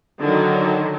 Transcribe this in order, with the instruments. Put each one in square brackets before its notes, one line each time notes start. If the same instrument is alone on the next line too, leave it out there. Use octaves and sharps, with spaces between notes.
[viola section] D3 D#3 F#3